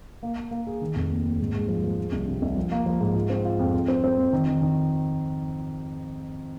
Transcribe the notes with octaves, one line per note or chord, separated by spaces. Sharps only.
A#3
A#3
A#3
G#4
D#3
F1
D#2
D#2
G#2
G#3
F3
F3
G#3
C2
C3
C2
F3
A#3
F3
G#2
F4
C4
F4
F2
F2
C4
C4
F2
D#3
D#3
D#3